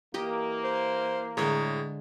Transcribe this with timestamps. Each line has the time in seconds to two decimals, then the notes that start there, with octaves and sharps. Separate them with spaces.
0.14 E3 A#3 G4 D#5
0.64 C5
1.37 A2 D3 G#3 G#4 C#5 A#5